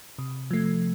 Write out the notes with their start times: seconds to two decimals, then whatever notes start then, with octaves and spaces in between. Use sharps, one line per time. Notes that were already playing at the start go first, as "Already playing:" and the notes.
0.19 C3
0.51 F3 A3